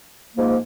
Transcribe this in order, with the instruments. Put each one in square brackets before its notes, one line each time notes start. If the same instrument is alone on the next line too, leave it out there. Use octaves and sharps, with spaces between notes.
[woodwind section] G#2 F3 A#3